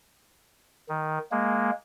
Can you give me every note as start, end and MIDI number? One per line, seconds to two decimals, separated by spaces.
0.89 1.18 51
1.31 1.71 56
1.31 1.71 58